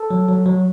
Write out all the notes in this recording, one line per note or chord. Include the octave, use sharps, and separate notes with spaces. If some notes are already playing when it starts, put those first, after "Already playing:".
Already playing: A4
F#3
F#3
F#3